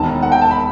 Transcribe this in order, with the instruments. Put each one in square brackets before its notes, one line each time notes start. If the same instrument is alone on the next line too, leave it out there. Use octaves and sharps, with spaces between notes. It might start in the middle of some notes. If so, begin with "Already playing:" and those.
Already playing: [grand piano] E1 D#2 D#3 [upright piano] A5
[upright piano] F#5
G5
A5
B5